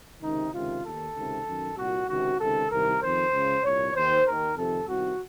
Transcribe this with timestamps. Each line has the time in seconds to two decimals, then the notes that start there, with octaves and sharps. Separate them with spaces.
0.22 C#2 C3 D#3 D#4
0.53 C#2 C3 D#3 F4
0.84 D#2 D#3 A4
1.15 C#2 C3 D#3
1.46 F#2 D#3
1.77 C2 A#2 F#4
2.08 C#2 C3 D#3 F#4
2.39 C#2 C3 D#3 A4
2.70 C2 C3 D#3 A#4
3.01 F2 D#3 C5
3.32 C#2 C#3
3.63 C2 A#2 C#5
3.94 D#2 D#3 C5
4.25 D#2 D#3 A#4
4.56 F2 C3 D#3 A4
4.87 C2 C3 D#3 F#4